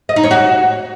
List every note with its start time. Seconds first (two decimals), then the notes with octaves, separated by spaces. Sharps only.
0.09 D#5
0.16 D#4
0.24 C#5
0.31 F#4